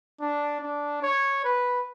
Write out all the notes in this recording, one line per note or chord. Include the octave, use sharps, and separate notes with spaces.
D4
D4
C#5
B4